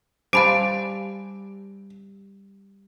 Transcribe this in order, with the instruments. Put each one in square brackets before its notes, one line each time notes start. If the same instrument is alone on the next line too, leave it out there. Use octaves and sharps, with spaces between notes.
[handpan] G3 [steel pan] C5 G#5 A5 [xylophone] F5 B5 D6 [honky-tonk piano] D7